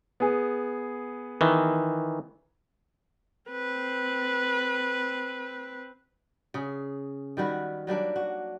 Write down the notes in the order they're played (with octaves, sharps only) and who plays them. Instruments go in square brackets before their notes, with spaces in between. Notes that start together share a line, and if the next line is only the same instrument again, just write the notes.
[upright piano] B3 G#4
[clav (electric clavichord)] D#3 E3
[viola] C4 B4
[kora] C#3 G#4
D#3 G3 F#4 B4
F#3 G3 A#3 D4
F#4